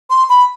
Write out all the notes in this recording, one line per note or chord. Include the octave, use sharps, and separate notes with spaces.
C6
B5